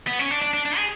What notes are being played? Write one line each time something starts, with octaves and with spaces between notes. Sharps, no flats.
B3
C#4
D4
D4
D4
D4
G#4